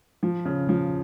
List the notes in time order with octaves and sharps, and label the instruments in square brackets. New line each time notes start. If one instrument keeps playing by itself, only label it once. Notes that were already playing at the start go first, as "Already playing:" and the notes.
[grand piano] F3
C#3
F3